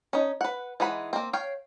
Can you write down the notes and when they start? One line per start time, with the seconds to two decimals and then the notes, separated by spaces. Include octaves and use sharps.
0.13 C#4 D#4
0.41 B4 F#5
0.80 E3 G#3 D#4 F#5 B5
1.13 A#3 C4
1.33 C#5 F5 G5